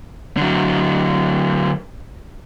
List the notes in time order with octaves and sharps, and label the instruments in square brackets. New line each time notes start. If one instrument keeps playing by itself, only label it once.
[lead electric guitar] D3 F#3